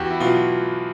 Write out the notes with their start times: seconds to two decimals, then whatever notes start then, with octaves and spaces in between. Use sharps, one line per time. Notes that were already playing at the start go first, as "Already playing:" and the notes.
Already playing: E2 F#4 G4
0.11 E4
0.20 B2 F#3 F4